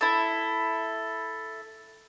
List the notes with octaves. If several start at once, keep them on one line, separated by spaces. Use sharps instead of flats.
E4 A4